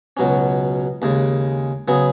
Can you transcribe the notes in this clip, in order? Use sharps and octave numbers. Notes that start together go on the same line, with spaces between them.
C#2 B2 F#3 C#4
D#2 C#3 G#3
C#3 F#3 B3 G#4